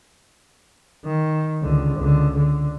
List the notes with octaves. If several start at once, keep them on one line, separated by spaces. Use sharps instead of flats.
D#3
C#2 D3
C#2 D3
D3